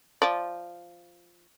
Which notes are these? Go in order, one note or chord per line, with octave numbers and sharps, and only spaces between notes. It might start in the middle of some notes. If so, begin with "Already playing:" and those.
F3 D5